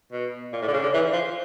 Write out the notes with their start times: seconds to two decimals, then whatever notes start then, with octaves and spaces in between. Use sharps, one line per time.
0.12 B2
0.53 A#2
0.62 A2
0.67 D3
0.73 C#3
0.82 D3
0.93 E3
1.12 F3